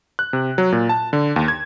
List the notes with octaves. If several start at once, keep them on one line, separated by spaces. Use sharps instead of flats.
F#6
C3
F#3
A#2
A5
D3
D#2
G#6